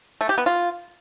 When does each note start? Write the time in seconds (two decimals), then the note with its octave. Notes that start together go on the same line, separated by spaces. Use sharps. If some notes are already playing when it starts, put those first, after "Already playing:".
0.21 A3
0.29 G4
0.38 B3
0.46 F4